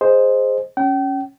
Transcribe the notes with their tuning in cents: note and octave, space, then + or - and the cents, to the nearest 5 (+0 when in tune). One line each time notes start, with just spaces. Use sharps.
G#4 +0 C5 +0 D#5 +0
C#4 +0 G5 -35